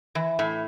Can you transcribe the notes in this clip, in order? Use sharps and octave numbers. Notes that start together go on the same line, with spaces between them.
E3
A2